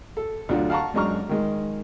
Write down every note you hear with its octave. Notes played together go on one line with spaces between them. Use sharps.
A4
D2 F#3 D4 F4 F#4
F5 F#5 A5 A#5 C#6
F#2 G#3 D4 A#5 C#6 F6
D#3 G#3